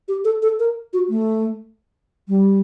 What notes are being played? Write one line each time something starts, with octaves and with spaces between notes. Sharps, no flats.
G4
A4
A4
A#4
F#4
A3
G3